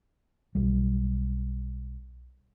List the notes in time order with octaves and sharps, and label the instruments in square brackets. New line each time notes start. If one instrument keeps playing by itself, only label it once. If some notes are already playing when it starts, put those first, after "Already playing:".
[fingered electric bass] B1 G3